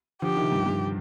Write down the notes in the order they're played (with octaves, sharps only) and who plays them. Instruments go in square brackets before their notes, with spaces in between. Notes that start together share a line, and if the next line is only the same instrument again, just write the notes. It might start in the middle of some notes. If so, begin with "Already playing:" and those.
[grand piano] D3 F3 [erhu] G4
[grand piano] C3 D#3
G2
G2